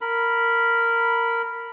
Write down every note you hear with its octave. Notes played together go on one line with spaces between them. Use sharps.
A#4 B5